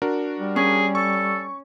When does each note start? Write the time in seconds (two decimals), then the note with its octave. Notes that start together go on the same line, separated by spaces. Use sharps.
0.02 D4 F#4 A#4
0.39 G3
0.56 C#4 G#4
0.95 A4 C#6